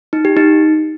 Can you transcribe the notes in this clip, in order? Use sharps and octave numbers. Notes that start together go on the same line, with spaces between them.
D#4
G4
D#4